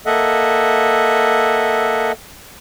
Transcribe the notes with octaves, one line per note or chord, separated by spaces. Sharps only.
A#3 A4 D#5 E5 F#5